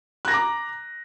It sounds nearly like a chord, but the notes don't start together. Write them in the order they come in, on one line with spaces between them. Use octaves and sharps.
F#6 A#6 A#5 D6